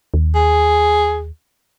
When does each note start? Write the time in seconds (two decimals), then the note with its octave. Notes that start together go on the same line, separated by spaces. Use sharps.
0.14 D#2
0.35 G#4